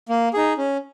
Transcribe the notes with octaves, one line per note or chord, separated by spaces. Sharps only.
A#3
D#4 G#4
C#4